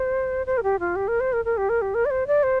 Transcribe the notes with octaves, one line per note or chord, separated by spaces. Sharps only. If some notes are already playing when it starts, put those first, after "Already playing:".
Already playing: C5
C5
A#4
G4
F4
G4
A#4
C5
A#4
A#4
G4
A#4
G4
A#4
D5
C5
D5
C5